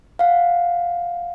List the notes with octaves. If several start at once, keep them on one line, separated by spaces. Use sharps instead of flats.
F5 F#5